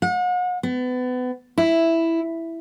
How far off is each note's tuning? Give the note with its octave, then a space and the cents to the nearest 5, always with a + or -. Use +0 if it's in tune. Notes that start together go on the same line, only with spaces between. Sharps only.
F#5 -40
B3 +30
E4 +0